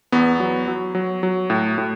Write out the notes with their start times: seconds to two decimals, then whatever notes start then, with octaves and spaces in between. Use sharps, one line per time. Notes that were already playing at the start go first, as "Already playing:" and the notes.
0.12 E2 B3
0.40 F#3
0.68 F#3
0.95 F#3
1.23 F#3
1.50 A2
1.78 A2